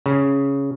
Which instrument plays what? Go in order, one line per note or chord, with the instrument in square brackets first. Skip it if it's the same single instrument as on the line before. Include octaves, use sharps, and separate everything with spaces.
[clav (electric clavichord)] C#3